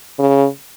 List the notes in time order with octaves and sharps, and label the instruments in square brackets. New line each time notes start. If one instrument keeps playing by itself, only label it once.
[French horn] C#3